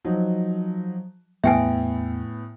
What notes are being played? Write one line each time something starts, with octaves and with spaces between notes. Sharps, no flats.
F3 F#3 D#4
E2 A2 B3 E4 E5 G5 G#5